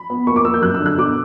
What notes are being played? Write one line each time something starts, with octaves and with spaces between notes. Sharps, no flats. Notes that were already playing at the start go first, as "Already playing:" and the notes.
Already playing: B5
B3
A#3 C#6
D6
A#3 E6
G6
F#2 F#6
E6
D3
F#6
B2 D6